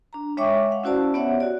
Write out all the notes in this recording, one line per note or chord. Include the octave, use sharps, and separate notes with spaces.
D4 A#5
G#3 C#5 E5 G5 C#6 D6
F5 F#5
C#4 E4 F#4 C5 D5 A5
B3 G4 C#5 E5 F#5
F#4 D5